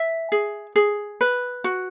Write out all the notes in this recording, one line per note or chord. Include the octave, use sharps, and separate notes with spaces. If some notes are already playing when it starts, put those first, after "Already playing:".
Already playing: E5
G#4
G#4
B4
F#4